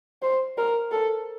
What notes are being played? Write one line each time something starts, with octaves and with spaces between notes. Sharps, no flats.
C5
A#4
A4